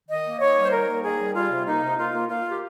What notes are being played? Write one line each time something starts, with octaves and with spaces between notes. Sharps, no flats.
D#3 D#5
A#3
D#3 C#5
G3
C5
D#3 A#4
A#3
D#3 G#4
G3
G3 F4
C3
A#3 D#4
C3
A#3 F4
A#3
A#3 F4
A#3
G4